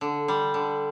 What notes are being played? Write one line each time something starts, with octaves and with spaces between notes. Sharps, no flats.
D3
G3
D3